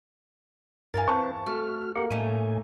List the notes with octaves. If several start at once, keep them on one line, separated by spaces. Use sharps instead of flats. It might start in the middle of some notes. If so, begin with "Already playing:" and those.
E2 G2 E3 A#4 F5 G#5 A6
C4 B4 C5 A5 C#6
A3 F#4 F6
A#3 G4 F#5
A2 A3 C#4 D#4 G#5